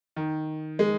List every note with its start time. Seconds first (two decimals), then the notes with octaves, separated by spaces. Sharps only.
0.16 D#3
0.79 G#3